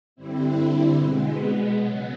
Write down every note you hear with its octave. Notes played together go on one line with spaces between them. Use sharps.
G2 D3 G3 C4 E4
B2 G#3 B3
C#3 F#3 B3